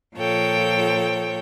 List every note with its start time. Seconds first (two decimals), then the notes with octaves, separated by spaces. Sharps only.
0.16 A#2 F3 A4 C#5 G5